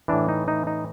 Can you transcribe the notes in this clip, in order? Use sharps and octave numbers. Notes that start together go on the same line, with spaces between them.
A2 E3 D4
D#4
D#4
D#4